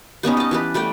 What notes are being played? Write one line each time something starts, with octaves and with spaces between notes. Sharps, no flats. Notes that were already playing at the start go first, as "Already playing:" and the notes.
G3 B3 C#4 D#4
D#5 A5
E3 G4 B4
G3 A3 D5 G5